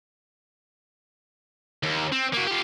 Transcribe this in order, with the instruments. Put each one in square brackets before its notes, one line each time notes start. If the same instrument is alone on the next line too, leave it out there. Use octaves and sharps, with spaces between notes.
[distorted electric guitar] D#2
C4
A#3 F#4
F4 G4